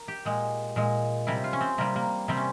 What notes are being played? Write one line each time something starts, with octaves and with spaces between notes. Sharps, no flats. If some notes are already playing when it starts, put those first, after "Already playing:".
Already playing: A#4
G4
A#2 G#3
A#2 G#3
C3 G3 E4
F4
C#4
C4
C3 G3 A#3
A#3
C3 G3 C4
C#4